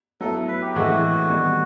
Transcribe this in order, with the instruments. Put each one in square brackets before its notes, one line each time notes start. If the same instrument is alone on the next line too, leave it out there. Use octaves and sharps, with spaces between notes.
[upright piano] F#3 B3 E4 [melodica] A4
[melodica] B4
G4
[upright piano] A2 E3 G#3 C4 E4 [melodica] F#4
[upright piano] D#3 G3 B3